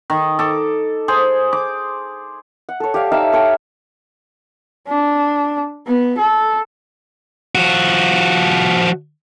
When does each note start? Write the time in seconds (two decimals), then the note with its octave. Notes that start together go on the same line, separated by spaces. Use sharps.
0.10 D#3
0.39 A4 D6
1.08 G#4 C5
1.53 D6
2.69 F#5
2.80 A4 C#5
2.94 G4 C#5 D5 F5
3.12 D#4 E5 F5 G5
3.33 A4 C#5 G5
4.88 D4
5.87 B3
6.18 A4
7.55 F3 F#4